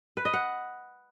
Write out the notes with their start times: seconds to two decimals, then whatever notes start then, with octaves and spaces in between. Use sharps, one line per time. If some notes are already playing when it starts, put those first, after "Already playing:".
0.17 B4
0.25 D#5
0.33 F#5